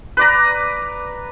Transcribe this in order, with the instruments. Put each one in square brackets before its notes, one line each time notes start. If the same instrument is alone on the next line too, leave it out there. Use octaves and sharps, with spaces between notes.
[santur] B4 D5 A#5